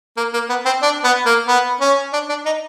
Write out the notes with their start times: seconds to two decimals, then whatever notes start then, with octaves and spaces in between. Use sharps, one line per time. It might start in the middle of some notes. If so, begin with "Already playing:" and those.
0.17 A#3
0.33 A#3
0.49 B3
0.66 C4
0.82 D4
1.04 B3
1.26 A#3
1.48 B3
1.81 C#4
2.13 D4
2.29 D4
2.46 D#4